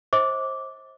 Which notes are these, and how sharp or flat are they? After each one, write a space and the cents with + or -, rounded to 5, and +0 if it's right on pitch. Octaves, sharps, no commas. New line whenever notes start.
C5 +25 D#5 +45 D6 -10